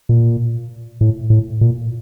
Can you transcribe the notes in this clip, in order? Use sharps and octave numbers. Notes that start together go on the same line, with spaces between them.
A#2
A2
A2
A#2